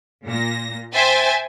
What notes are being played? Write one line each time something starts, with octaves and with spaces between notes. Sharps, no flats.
A#2 A#6
C5 E5 G5 G#5 A6